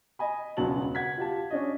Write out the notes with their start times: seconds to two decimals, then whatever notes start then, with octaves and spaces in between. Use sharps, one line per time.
0.19 D#5 G#5 B5
0.57 E1 C#2 B2 F#3 A5 F#7
0.95 F#5 G#6 B6
1.17 F4 G4 A5
1.50 C#4 D4 D#5